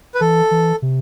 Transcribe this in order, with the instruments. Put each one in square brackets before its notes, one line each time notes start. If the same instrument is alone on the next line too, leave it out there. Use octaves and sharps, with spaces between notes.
[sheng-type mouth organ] B4
[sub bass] E3 [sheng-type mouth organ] A4
[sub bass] E3
C3